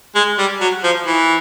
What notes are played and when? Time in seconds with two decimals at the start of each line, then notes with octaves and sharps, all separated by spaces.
0.15 G#3
0.38 G3
0.61 F#3
0.83 F3
1.07 E3